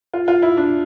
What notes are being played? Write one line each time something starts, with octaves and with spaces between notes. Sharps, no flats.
F4
F4
E4
D4